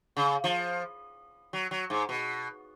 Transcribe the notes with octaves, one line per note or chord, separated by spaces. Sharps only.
C#3
F3
F#3
F#3
G#2
B2